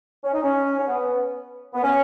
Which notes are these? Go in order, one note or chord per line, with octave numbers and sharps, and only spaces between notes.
C#4
D#4
C#4
C#4
B3
B3
C#4